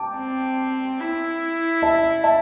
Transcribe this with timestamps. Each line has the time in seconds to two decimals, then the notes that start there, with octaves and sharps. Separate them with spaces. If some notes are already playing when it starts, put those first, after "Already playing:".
Already playing: G5 A5 D6
0.17 C4
1.00 E4
1.82 E5 A5
2.24 E5 A5